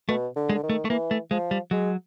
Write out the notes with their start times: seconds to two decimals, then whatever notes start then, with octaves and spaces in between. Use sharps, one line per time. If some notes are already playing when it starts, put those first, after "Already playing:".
0.08 B2 A3
0.36 D3
0.49 G#3
0.55 D3
0.64 D#3
0.69 A3
0.85 A3
0.90 E3 A#3
1.11 A3
1.31 F3 G#3
1.51 G3
1.71 F#3 G#3